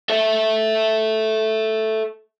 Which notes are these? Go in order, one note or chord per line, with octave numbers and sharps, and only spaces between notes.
A4 E5